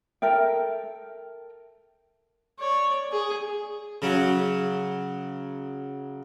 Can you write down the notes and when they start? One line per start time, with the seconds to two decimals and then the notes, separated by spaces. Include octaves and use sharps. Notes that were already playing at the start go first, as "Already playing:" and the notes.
0.22 A4 A#4 E5 G5
2.59 C#5 D5
3.12 G#4
4.02 C#3 F#3